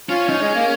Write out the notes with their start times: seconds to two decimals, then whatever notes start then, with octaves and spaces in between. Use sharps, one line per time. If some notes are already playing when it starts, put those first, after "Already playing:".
0.09 C#4 F4
0.29 C#4 D#4
0.41 G#3
0.55 A#3